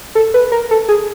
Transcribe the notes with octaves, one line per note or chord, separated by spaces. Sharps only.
A4
B4
A#4
A4
G#4